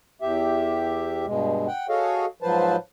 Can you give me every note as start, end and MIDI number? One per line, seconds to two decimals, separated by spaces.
0.22 1.26 40
0.22 1.26 67
0.22 1.26 76
1.26 1.67 43
1.26 1.67 47
1.26 1.67 56
1.67 1.87 78
1.67 1.87 79
1.89 2.26 66
1.89 2.26 68
1.89 2.26 69
1.89 2.26 73
1.89 2.26 75
1.89 2.26 77
2.42 2.76 44
2.42 2.76 53
2.42 2.76 54
2.42 2.76 71
2.42 2.76 72
2.42 2.76 81